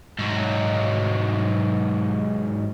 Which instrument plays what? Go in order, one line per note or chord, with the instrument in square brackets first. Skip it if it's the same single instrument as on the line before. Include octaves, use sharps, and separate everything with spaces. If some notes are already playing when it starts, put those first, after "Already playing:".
[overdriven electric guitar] G#2 F#3